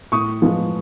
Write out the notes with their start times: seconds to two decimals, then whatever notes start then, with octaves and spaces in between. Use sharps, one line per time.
0.12 A2 C#6 D#6
0.42 F3 G#3 B3